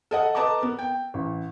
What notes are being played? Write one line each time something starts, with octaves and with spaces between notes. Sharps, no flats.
A4 D#5 F#5
A4 B4 D#5 A5 A#5 D6
B3 A#4
G5
A1